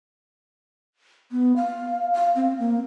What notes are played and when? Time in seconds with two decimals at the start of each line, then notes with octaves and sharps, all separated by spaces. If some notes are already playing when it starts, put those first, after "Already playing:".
1.32 B3
1.56 F5
2.14 F5
2.36 C4
2.59 A#3